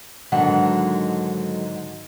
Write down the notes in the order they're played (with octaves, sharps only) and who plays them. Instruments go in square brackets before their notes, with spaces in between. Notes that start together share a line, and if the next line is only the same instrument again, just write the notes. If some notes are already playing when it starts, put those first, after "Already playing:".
[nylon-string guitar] G#2 D3 D#3 F#3 F#5 A5